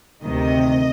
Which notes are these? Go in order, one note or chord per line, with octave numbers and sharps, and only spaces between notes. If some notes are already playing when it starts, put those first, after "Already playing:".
D2 C3 D#3 D#5